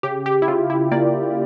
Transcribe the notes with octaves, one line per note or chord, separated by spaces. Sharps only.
C#3 G4
G4
E4
C#3 F4
E4
A#3 D5